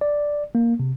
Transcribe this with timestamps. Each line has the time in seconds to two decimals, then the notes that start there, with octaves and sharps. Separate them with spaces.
0.01 D5
0.55 A#3
0.80 C3